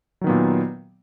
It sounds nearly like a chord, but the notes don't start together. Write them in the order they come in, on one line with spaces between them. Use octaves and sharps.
F#3 D#3 B3 A#2